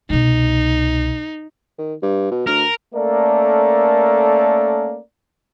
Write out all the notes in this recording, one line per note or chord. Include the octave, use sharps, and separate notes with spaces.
C2 B2 D#4
D#3
G2
B2
D2 A#4
A3 A#3 C#4 A4 A#4 D5